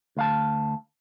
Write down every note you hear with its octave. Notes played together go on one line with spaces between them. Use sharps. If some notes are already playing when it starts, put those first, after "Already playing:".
D2 F5 A5